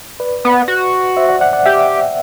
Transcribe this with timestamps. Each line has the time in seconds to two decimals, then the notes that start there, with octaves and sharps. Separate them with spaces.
0.20 B4 D5
0.45 B3
0.68 F#4
1.17 C5 E5
1.29 D5 F#5
1.41 D5 F#5
1.53 D5 F#5
1.65 G4 E5 G5